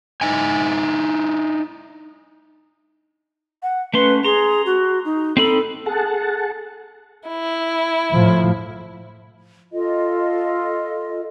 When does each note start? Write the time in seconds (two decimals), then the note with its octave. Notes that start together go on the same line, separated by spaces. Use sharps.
0.21 D#4 E4 G#5
3.63 F#5
3.94 A3 C#4 B4 C6
4.24 G#4 A#5 C6
4.66 F#4
5.05 D#4
5.37 C4 D#4 A4 B5
5.86 G#4 A4 F#5 A5
7.27 E4
8.13 A2 F3
9.72 F4 A4 D#5